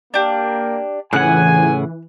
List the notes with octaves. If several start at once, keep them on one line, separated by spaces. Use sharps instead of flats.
A#3 D4 G4
A#1 A2 C#3 E3 F#5 G#5 F#6